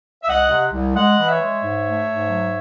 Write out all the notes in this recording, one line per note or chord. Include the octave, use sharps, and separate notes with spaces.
E5
C2 D#5 F#5
C3
C2
G#3 D#5 F#5
E3
C#5 E5
G#3
G#2
A3
G#2
F#3